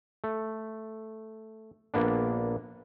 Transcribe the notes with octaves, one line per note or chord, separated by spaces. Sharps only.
A3
A#1 A#3 B3 D4